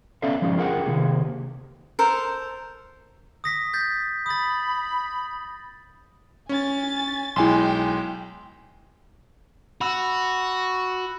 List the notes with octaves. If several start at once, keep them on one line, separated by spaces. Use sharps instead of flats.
B3 C#4 A4 D5 E5 F5
F3 G#3 C#4 D#4 G4 D5
F4 G#4 A#4 E5 F#5 G5
C3 D#3 A#3 G4 G#4
A4 A#4 C5
D#6 A#6 B6
G6 A6 B6
B5 D#6 A6
C#4 G#5 A6
B1 G#3 E4 G5 G#5 C6
F#4 B5 E6